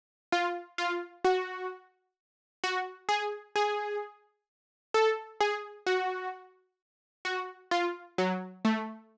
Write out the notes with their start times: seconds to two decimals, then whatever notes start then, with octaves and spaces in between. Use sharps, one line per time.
0.32 F4
0.78 F4
1.25 F#4
2.64 F#4
3.09 G#4
3.56 G#4
4.94 A4
5.41 G#4
5.87 F#4
7.25 F#4
7.71 F4
8.18 F#3
8.65 A3